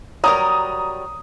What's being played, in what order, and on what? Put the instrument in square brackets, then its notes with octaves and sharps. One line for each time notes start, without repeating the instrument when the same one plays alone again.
[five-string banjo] F#3 G3 A#4 [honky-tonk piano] A#5 D#6